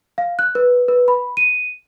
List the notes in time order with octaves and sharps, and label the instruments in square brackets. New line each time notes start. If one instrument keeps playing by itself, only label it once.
[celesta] F5
F#6
B4
B4
B5
D#7